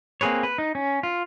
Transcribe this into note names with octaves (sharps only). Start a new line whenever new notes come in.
A#3 C4 G#4 B4 C#5
B4
D#4
C#4
F4